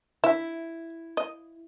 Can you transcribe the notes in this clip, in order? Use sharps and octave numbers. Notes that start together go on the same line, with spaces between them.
E4 E5
D#5